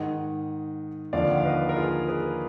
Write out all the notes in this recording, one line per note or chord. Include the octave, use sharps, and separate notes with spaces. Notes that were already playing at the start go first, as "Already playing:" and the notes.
Already playing: G#2 D#3 D#5 F#5
D#2 D3 F3 D5 F5
F#5
F5
B4 D#5
A#4
F4 G#4
G#4 B4